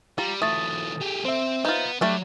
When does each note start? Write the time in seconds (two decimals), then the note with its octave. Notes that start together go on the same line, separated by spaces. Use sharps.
0.18 G3 F4 A#5
0.42 E3 F#3 A3 D#6 A6
1.01 G4 G#4
1.25 C4 C5 E5
1.65 B3 D#4 F4
2.01 F#3 G3 A3 D4